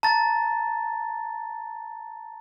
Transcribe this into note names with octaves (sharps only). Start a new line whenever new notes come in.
A5 A#5 A6